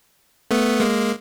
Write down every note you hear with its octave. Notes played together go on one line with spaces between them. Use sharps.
A3 B3
G#3 A#3